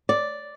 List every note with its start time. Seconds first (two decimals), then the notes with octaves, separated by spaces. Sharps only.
0.09 D5